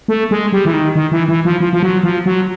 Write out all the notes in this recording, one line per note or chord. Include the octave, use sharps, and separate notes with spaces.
A3
G#3
G3
E3
D#3
D#3
E3
E3
F3
F3
F3
F#3
F3
F#3